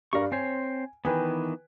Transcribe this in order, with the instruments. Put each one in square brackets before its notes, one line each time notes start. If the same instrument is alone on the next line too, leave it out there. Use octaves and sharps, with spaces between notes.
[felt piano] G2 D5 F5 [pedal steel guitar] A#4 C#6
[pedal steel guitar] C4 C5 C#5 [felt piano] G#5
[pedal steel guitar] D#3 E3 B3 [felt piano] B4 G5 G#5